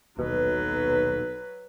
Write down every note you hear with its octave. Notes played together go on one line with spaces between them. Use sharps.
D#1 B1 B2 F#3 B4